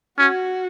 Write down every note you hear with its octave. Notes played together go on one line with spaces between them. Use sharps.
C#4 F#4